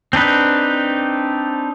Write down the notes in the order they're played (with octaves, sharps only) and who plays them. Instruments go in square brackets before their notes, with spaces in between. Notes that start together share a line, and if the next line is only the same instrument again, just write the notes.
[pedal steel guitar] C4 D4 D#4 B4